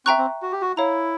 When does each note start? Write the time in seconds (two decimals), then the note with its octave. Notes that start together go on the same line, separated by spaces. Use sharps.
0.06 C4 E5 G5 A#5 C#6 F#6
0.18 C4
0.42 F#4
0.52 G4
0.62 F#4
0.77 E4 C#5 F5 A#5